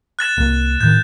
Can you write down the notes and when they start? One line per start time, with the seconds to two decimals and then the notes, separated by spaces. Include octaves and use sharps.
0.19 F#6 A6 E7
0.37 C2 C3 A#3
0.80 A2 D#3 G6